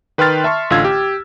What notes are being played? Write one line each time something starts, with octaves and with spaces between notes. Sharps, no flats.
D#3 B4 G5 C6 F6 A6
E5 A5 C6 C#6
A1 D3 F4 F5 E6 G#6
G4